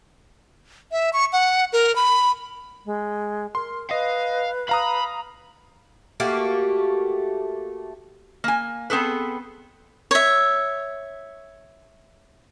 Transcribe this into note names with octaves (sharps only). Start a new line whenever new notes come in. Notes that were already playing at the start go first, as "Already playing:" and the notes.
E5
C#6
F#5
A#4
B5
G#3
A#4 C6
B4 D#5 F5
F5 A#5 B5 D#6
A3 A#3 F#4 G4
A#3 G#5
B3 C4 G#4 A4 B4
C#5 E5